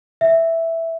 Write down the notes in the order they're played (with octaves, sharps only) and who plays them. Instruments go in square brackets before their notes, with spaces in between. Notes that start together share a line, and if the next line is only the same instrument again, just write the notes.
[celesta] E5